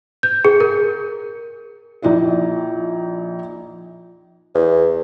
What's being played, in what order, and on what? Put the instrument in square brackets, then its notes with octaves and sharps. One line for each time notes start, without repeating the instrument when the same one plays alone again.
[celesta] G6
G#4
A#4
[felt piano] A#1 D#4 E4 D5
[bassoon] E2